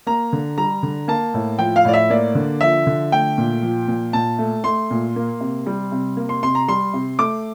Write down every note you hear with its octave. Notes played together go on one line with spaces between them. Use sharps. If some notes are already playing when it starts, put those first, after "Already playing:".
A#3 A#5
D3
G3 A#5
D3
A#3 A5
A2
F3 G5
F5
A2 D5
E5
A#3 D5
D3
F3 E5
D3
A3 G5
A#2
F3
A#2
A#2 A5
A3
A3 C6
A#2
A#3
C3
G3
C3
A#3
C6
C3 C6
A#5
G3 C6
C3
A3 D6